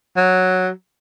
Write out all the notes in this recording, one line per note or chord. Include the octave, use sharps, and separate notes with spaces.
F#3